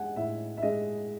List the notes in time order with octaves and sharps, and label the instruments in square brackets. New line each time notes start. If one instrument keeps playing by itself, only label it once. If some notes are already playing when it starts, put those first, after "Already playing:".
Already playing: [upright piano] G#3 F#5 G#5
A2 E5
E5
G#3 D#5